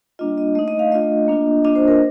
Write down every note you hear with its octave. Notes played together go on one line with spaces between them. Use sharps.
G3 A#3 D4 F4 D#5
D#5
A3 D#4 D#5
D#5
F5
A3 D4 F4 D#5
A#3 D4 F4
A#3 D4 F4 D#5
C5
A#4